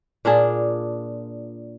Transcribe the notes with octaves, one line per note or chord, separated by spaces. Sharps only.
A#2 D4 F4 G#4